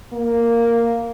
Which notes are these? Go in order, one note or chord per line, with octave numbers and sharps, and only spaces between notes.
A#3